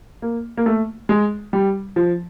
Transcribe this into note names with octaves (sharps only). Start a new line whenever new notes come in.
A#3
A#3
A3
G#3
G3
F3